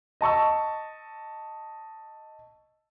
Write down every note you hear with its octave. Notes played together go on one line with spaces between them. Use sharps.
D#5 A5 C#6 E6